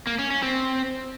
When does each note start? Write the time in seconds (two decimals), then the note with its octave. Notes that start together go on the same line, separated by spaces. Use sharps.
0.07 A#3
0.19 C#4
0.30 C#4
0.42 C4